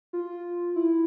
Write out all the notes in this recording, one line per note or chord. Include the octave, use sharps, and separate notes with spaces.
F4
E4